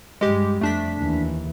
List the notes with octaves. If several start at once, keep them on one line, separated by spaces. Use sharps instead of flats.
G2 G3 G#3 G4
F2 A3 D4 B6
D#2 E3